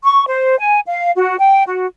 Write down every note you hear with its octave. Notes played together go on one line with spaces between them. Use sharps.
C#6
C5
G#5
F5
F#4
G5
F#4